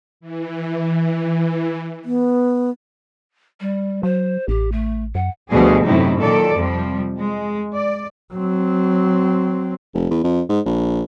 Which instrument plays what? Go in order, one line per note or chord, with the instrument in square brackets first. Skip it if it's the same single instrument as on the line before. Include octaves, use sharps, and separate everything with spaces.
[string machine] E3
[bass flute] B3
[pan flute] G3
[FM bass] F#3 [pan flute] C5
[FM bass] A1 [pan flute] G4
[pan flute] A3
[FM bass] F#2 [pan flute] F#5
[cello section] D2 B2 F3 G3 G#4
F#2 A2 C3 D#4 E4
A#2 D#3 F#3 A4 D5
F2 C3 F3 G3
G#3
D5
[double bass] F#3 C4
[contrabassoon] F1
E2
F2
G#2
A#1